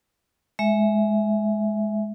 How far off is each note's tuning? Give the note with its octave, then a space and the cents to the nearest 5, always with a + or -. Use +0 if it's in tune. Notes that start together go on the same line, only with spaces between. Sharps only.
G#3 +15 E5 +0